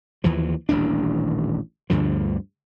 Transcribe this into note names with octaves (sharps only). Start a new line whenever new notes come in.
D#2 E3 F3
D#1 A1 D#2 D4
D2 G2 D3 F3